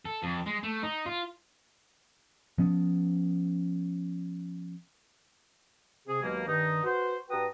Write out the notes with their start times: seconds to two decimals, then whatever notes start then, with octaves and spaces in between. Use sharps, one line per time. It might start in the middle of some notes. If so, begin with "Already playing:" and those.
0.06 A4
0.23 F2
0.46 G#3
0.63 A3
0.83 D#4
1.06 F4
2.58 F3 B3 C#4
6.08 C3 G#4
6.23 D#2 B2 F#3 G#3 A#3
6.46 G2 D#3 D#4
6.83 F#4 B4 C5
7.30 G2 F#4 B4 G5 A#5 D#6